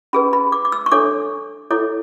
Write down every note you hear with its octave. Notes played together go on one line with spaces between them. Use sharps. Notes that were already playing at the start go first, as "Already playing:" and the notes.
C#4 G#4 B4 B5
B5
D6
D6
E6
C#6
D4 A4 C#5 D6
E4 A4 C#5 D6